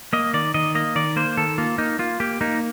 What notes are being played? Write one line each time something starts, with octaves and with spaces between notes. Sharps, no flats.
A#3 D#5
D#3 D5
D#3 D#5
A#3 D#5
D#3 D5
A#3 C5
D#3 A4
A#3 F4
A#3 D#4
A#3 F4
A#3 G4
A#3 D#4